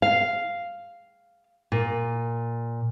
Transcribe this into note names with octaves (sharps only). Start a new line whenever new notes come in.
F5
A#2